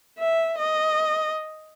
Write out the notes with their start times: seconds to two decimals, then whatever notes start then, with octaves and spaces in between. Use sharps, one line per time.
0.19 E5
0.58 D#5